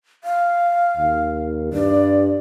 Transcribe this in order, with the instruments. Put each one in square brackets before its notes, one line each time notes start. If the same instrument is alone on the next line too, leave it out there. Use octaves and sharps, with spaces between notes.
[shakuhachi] F5
[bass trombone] D#2
[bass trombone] G2 [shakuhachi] D5